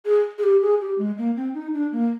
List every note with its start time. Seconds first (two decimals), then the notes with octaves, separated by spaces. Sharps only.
0.05 G#4
0.38 G#4
0.43 G4
0.62 G#4
0.81 G4
0.98 G#3
1.18 A#3
1.36 C4
1.54 D#4
1.74 D4
1.92 A#3